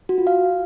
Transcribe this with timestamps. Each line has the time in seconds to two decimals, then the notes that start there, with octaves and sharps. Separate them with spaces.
0.09 F#4
0.18 F4
0.27 F5